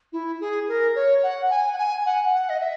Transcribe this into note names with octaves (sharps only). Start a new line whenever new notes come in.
E4
G#4
A#4
C#5
F#5
G#5
F#5
G#5
F#5
F#5
D#5
E5